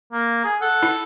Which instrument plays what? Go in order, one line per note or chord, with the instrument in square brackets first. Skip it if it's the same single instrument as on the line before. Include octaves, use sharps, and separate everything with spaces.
[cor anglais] A#3
G#4
[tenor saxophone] A4 [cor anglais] F#5
[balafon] E4